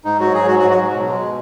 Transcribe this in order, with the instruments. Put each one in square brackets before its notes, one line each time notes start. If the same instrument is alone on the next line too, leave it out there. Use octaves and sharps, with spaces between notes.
[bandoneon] G#2 D#4
F#3 F#4
G#2 G#4
F#3 F#4
F#4
G#2
F#4
F#3
B2
G#3
B2